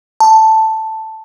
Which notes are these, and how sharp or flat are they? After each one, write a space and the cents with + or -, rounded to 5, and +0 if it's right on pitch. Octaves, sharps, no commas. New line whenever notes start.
A5 +5